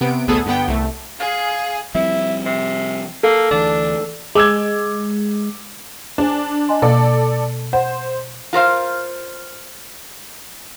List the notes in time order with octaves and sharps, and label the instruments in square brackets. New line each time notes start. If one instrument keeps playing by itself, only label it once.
[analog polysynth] C3 B3 D7
A1 D2 B3 G#4 A4 D#6
G2 D3 B3 G5
C2 A3
[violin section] G#4 [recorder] F5
[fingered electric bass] F3 G3 C4 [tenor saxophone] E4
[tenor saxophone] C3
[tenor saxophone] A#3 [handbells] A4
[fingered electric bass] D2 E3 [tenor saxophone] D4
[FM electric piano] G#3 [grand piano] D6 E6 G#6
[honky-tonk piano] D4 [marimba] G#4 C5 G#5
[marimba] D#5 G#5 C6
[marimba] B2 A#3 F5 [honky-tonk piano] A4 D5
[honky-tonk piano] C5 [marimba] F#5
[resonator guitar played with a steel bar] F4 A#4 C5 F5